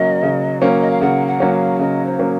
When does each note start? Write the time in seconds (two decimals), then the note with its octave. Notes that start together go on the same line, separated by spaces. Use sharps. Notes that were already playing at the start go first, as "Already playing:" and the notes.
Already playing: C#3 F#3 A#3 C#4 D#5
0.23 C#3
0.61 F#3 A#3 C#4 C5
0.71 C#5
0.81 D#5
0.91 F5
1.01 C#3 F#5
1.27 F#5
1.40 F#3 A#3 C#4
1.53 F5
1.79 C#3 D#5
2.05 C5
2.19 F#3 A#3 C#4